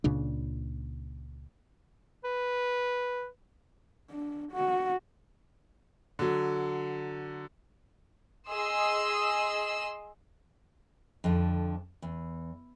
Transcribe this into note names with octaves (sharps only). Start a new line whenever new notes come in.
C#2 A#2 C#3 D4
B4
D4
F#4
D3 F#3
G#4 D#5 C6 E6
F2 D3
E2